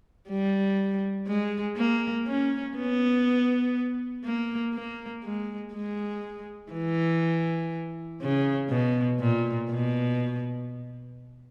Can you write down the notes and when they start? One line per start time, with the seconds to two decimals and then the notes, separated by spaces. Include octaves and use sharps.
0.29 G3
1.28 G#3
1.76 A#3
2.27 C#4
2.77 B3
4.25 A#3
4.74 A#3
5.23 G#3
5.74 G#3
6.72 E3
8.21 C#3
8.70 B2
9.20 A#2
9.70 B2